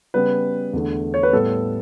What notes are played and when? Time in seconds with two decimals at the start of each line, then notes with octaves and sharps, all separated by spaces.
0.14 C#3 G3 B3 B4
0.73 E2 D3 A3
1.14 C#5
1.23 B4
1.33 A2 G3 B3 A4